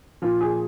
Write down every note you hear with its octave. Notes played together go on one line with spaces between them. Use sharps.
A#2 F3 F4
G#4